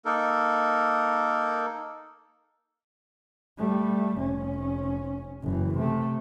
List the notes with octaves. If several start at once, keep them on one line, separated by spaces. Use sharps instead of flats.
A#3 D#4 A4 A#4
G3 A3
F1 C#4
F#1 E3
C3 A3